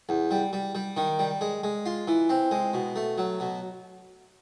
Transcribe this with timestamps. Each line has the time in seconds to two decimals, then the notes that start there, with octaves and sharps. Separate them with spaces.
0.09 E2
0.31 G3
0.53 G3
0.75 G3
0.97 D#3
1.19 G3
1.41 G#3
1.64 G#3
1.86 F4
2.08 E3
2.29 C4
2.51 G#3
2.73 B2
2.96 A3
3.18 F#3
3.40 B2